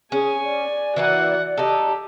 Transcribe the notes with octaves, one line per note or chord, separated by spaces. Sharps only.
C#4 G#4 G#5
D5
E3 A#3 E4 F#4 F#5
D#4 G4 A4